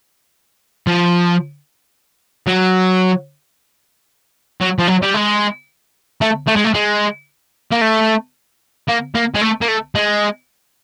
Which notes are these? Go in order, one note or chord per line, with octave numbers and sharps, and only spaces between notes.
F3
F#3
F#3
F3
F#3
G3
G#3
A3
A3
G#3
A3
G#3
A#3
A3
A#3
A#3
G#3
A3
A#3
A3
G#3